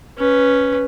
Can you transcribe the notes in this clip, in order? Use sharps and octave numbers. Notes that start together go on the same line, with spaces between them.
C#4 B4